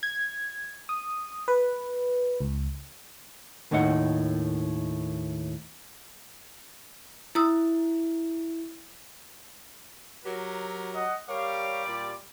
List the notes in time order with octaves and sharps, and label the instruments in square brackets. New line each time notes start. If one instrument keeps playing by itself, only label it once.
[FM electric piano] G#6
D#6
B4
C#2
[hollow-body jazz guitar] D#2 A2 D#3 D#4 E4 F#5
[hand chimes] E4 [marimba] A#5 D#6 E6
[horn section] F#3 G4 A#4
[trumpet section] D#5 F#5
[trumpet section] G3 G4 D6 [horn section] A#4 C#5 F5
[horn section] A#2 D5